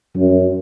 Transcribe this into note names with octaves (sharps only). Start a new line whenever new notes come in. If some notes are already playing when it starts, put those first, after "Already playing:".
F#2